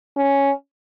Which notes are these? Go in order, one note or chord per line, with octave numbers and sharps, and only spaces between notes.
C#4